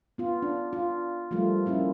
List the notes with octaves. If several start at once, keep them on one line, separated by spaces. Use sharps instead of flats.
B3 F4
D4
F4
F3 G3 A3 A#3 F4
A#3 C#4 E4 F4